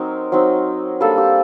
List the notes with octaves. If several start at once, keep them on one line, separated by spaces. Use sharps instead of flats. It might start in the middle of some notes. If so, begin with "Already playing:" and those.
Already playing: F#3 C4 D#4 A#4
F#3 C4 D#4
G3 A#3 D4 A4
G4